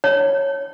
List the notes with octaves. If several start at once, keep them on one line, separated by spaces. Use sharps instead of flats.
C#5